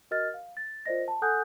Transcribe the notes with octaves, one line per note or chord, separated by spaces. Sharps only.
F#4 A#4 D#5 F6 A6
F5
A6
F4 A#4 C5 D5 D#5 A#6
A5
A4 F#5 G#5 D#6 F#6 G6